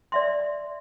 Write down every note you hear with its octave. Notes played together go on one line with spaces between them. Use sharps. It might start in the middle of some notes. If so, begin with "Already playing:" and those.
D5 E5 C6